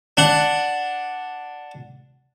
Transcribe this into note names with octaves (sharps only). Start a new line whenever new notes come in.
D4 F#5